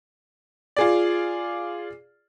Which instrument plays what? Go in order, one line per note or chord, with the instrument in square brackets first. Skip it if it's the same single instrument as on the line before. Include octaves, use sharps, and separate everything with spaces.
[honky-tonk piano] F4 G#4 D5